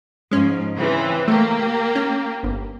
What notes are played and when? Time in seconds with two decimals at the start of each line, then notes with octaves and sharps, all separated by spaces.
0.31 G#2 F3 G#3 C#4
0.77 C#3 E3 C4
1.28 A3 A#3 G4
1.95 C#4
2.43 G1